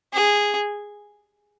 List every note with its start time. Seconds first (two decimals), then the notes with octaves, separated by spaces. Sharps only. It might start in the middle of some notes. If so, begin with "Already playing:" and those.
0.14 G#4